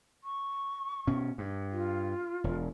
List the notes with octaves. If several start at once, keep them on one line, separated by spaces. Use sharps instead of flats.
C#6
B2 C#4
G2
F4
E1